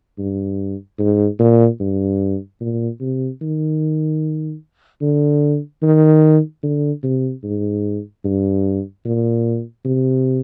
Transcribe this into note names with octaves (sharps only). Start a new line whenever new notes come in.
G2
G#2
A#2
G2
A#2
C3
D#3
D3
D#3
D3
C3
G#2
G2
A#2
C3